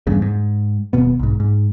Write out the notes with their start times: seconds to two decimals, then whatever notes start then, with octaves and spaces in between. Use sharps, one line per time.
0.07 E2 G2 C#3
0.22 G#2
0.93 D#1 B2 B3
1.19 B1 G#2
1.40 G#2